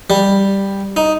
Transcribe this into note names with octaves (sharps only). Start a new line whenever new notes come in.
G3
D#4